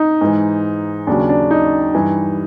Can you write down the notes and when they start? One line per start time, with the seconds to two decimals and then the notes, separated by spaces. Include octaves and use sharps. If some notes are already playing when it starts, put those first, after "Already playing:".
Already playing: D#4
0.21 G#2 E3
1.07 D#2 C#3 F#3 D4
1.29 D4
1.51 D#4
1.95 G2 E3